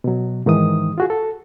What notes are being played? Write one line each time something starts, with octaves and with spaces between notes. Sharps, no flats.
B2 F#3
G#2 D#3 E3 D#6
F4 F#4 G#4
A4